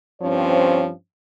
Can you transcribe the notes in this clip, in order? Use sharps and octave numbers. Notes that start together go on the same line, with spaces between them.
G2 F3 C4 C#4 C#5